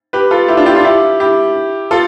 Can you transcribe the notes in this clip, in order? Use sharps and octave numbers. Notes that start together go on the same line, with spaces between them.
G4 B4
F4 A4
E4 G4
D4 F4
E4 G4
D4 F4
E4 G4
E4 G4
F4 A4